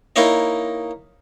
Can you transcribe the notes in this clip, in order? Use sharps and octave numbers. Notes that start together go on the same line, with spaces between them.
A#3 D#4 E4 C#5 D#5